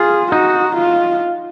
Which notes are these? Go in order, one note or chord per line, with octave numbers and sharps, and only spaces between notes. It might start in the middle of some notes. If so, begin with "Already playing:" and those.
Already playing: F4 G#4
D#4 F#4
F4